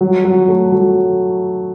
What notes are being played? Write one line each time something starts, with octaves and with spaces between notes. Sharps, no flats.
F#3
F#3
A3
F#3